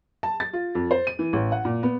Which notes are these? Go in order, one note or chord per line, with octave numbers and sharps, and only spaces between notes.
A5
A6
F4
F2
C5
D#7
E3
A1
F#5
A#2
B3